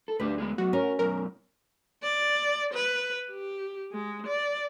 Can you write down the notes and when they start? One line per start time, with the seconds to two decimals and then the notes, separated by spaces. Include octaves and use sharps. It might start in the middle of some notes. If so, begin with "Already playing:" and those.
0.08 A4
0.20 D2 D4 G4 B4
0.38 G#3 B3 G#4
0.58 F#3 B3 F#4
0.73 C#4 A#4
0.99 F#2 B2 A#4
2.03 D5
2.73 B4
3.30 G4
3.92 G#3
4.26 D5